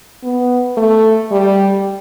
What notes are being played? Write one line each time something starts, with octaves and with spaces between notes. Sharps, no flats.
B3
A3
G3